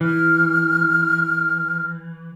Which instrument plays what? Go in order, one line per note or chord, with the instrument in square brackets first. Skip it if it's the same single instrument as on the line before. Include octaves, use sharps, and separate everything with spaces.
[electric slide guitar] E3 [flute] F6